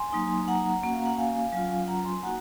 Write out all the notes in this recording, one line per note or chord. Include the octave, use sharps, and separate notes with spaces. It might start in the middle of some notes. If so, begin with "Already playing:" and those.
Already playing: G#5 C6
F#3 A#3 D#4
G#5
F#5 A#5
A#3 C#4 F#4
F5
F#5
F5 G#5
F#3 C#4 F4
F#5 A#5
G#5 C6
G#5
A#3 D#4 F#4 F#5 A#5